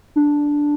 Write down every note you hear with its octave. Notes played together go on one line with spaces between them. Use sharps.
D4